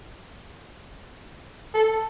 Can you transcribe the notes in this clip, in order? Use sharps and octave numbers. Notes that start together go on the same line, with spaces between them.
A4